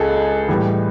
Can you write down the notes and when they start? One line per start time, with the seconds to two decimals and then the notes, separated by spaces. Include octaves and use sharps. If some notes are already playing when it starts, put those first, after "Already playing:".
Already playing: C#2 G#4 A4
0.48 A2 E3 G3